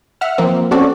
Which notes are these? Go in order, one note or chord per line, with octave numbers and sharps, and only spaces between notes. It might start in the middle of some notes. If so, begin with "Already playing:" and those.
E5 F#5 F6
F3 A#3 C4
C4 C#4 F#4 A4 D5